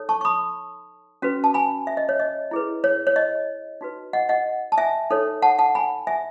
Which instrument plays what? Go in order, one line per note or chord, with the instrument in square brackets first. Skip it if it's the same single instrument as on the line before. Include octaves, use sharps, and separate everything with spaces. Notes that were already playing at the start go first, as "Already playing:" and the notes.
Already playing: [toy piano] D#4 A4 C#5
A5 C#6
C#6
B5 D#6
C#4 F#4 B4
A5
G#5 B5
E5
D#5
C#5
D#5
E4 G#4 B4
C#5
C#5
D#5
D#4 F#4 B4
D#5 F#5
D#5 F#5
A5
E5 G#5
D#4 A4 C#5
F#5 A5
F#5 A5
G#5 B5
E5 G#5